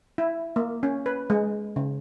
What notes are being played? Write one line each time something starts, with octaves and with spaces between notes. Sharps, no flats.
E4
A#3
C#4
B4
G#3
C#3